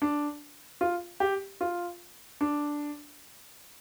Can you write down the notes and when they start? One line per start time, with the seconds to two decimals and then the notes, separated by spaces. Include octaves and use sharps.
0.02 D4
0.81 F4
1.20 G4
1.61 F4
2.41 D4